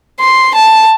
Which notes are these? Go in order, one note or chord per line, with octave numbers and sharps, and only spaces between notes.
C6
A5